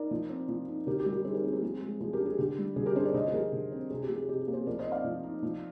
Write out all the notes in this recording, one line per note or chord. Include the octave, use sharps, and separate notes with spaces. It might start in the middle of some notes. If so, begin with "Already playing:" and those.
Already playing: D#4 A#4 D5
F3
C4
F3
D#4
D3 G4 A#4
G4
G3
G4 A#4
D#4 G#4 C5
G4 A#4
C4 G#4
G4 A#4
F3 G#4
G#3 G#4
F3 G#4
G4 A#4
D4
G#4
D3 G4
G3
D3 G#4
G4 A#4
D4 G#4 C5
A#4 D5
D3 C5 D#5
G#4
F3 G4 A#4
D3
C4
C3 G#4
G4
F3
G#4
C3 G4
G#4
A#3
G#4 C5
F3 A#4 D5
C5 D#5
C4
D5 F5
F3
D#4
F3